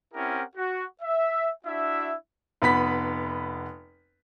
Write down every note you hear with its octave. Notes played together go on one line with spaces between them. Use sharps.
C4 C#4 E4 G4 A#4 F#5
F#4
E5
D4 E4 F#4 E5
F1 B3 B5 B6